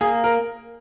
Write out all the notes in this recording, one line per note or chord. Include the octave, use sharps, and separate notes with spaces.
A#3 G#4
A#4